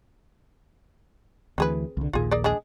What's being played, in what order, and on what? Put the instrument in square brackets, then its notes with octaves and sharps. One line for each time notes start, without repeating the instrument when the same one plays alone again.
[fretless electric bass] D2 E3 [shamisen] C4 G#4 B4
[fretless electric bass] C2 D3
[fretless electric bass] A#1 D#2 A#2 [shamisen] F4 G#4
[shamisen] G#4 A#4 D5
G#3 D4 G#4